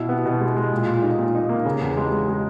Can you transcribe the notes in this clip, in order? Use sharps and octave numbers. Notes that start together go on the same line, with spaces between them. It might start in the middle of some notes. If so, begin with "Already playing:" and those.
Already playing: B2 E4
B3
B2
G#3
G#3
A#2
A#2
D#4
A#2
D#4
A#3
C#3
E2
G#3
G#3
G#3